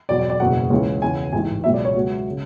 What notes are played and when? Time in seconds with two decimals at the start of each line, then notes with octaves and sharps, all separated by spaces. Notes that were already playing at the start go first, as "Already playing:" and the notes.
0.09 E2 B2 F#3 D5
0.19 D5
0.30 D5
0.40 F#1 E2 B2 F#3 F#5
0.70 C#2 C#3 E3
1.02 E2 C#3 E3 G#5
1.33 A1 G#2 E3 G#5
1.64 C#2 B2 F#3 E5
1.74 D5
1.85 C#5
1.95 C#2 C#3 F#3 F#4
2.30 C#3